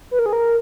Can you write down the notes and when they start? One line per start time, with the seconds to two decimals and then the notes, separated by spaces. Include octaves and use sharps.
0.11 B4
0.19 A#4
0.26 G#4
0.33 A#4